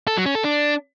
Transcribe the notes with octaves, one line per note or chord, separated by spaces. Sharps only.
A4
F#3
C#4
A4
D4